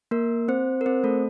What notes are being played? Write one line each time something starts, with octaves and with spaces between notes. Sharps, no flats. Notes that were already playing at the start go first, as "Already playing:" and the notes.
A#3 A#4
C4 C5
A#4
C4 C5
A3 A4